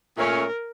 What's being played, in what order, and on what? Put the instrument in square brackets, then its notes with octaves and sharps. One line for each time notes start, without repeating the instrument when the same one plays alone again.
[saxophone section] A#2 A3 C#4 [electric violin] A#4